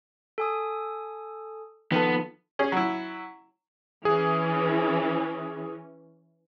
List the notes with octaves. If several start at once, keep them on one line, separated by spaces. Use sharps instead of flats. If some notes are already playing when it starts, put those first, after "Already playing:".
A4 G#5 D#6
D#3 F3 B3 A4
C#4 G#4
F#3 E4
E3 C#4 G#4